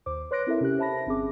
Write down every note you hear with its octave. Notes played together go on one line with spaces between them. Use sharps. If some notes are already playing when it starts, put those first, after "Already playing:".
D#2 C5 D6
B4 C#5 C6 F#6 A#6 D7
C4 E4 A4 A#4 E5
C3 C#4 G4 F#6
C5 E5 A5 B5 A#6
G1 C4 C#4 G#4 D6